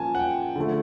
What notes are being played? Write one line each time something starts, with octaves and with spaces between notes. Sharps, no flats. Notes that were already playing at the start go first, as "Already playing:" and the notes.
Already playing: A#2 F3 A#3 C#4 G#5 A5
F#5
G5
D3 F3 A3